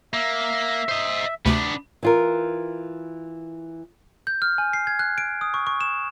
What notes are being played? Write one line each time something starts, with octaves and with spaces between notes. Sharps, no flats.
A#3 E5
C5 D#5
D2 C3 A3 B3 D4
E3 F4 A#4
G6
F6
G#5
C7
G#6
F#6
D7
D#6
C#6
C#6
E7